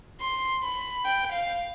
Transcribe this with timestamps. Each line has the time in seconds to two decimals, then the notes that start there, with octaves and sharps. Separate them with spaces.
0.20 C6
0.63 B5
1.05 G5
1.32 F5